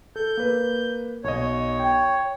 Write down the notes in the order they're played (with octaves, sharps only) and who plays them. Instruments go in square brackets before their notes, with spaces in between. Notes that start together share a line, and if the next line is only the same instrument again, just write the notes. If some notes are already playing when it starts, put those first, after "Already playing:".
[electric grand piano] A4 [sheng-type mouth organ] G6
[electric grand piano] A#3 B4
[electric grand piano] B1 D#5 [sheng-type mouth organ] C#5
[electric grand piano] G5